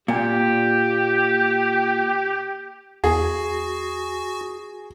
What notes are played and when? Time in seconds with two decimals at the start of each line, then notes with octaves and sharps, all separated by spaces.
0.08 A#2 G4
3.04 E2 F#4 G#4